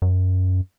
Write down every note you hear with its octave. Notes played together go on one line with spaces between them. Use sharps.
F#2